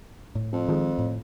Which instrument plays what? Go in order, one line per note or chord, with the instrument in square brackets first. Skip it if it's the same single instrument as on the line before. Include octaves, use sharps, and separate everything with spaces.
[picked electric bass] A2
[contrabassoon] F2
[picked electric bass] D#3 F3 G#3
A2